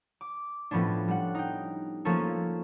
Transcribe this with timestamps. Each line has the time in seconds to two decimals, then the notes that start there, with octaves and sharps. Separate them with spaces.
0.21 D6
0.71 A2 F3 B3 C#4 D4
1.08 G3 F#5
1.35 D#4 G5
2.05 F3 A3 A#3 C#4 A4 C#5